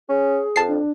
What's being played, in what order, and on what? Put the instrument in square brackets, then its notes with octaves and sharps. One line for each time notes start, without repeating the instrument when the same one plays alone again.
[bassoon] C#4 [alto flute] G#4
[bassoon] F2 [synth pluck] A5 C7
[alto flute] D4